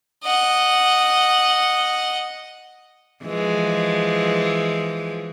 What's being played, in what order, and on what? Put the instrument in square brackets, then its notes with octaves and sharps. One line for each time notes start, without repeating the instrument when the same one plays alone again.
[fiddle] D#5 F#5
[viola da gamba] E3 F3 G#3